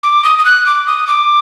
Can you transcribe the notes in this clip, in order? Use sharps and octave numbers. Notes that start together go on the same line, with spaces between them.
D6
D#6
D#6
F#6
D6
D#6
D6